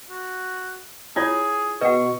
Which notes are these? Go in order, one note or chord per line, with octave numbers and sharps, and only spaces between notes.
F#4
E4 F4 G#4 C#5 G#6
B2 B4 D#5 F#5 C#6